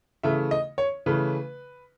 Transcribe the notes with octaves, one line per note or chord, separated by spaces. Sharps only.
C#3 E3 A3 E5
D#5
C#5
C#3 E3 A3 B4